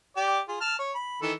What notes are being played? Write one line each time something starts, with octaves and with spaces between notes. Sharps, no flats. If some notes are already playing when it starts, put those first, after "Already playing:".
G4 D5
F4 G#4
A5 F6
C#5
B5
D#3 E3 A4